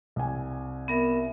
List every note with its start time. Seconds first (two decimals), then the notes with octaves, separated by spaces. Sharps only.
0.16 C2 G#5
0.88 B3 A#4 E5